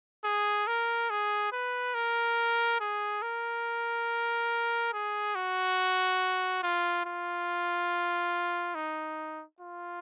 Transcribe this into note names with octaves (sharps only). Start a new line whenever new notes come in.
G#4
A#4
G#4
B4
A#4
G#4
A#4
G#4
F#4
F4
F4
D#4
F4